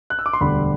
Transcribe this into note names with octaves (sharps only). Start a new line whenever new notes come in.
F#6
E6
D6
C6
E1 D2 D3 G3 B5